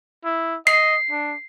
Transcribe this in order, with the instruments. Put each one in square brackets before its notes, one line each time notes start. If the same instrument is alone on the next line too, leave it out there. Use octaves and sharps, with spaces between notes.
[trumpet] E4
[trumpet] D#5 [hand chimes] C7
[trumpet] D4